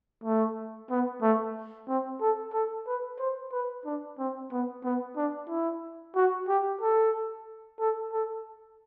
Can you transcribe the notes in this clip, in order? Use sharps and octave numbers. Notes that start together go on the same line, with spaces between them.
A3
B3
A3
C4
A4
A4
B4
C5
B4
D4
C4
B3
B3
D4
E4
F#4
G4
A4
A4
A4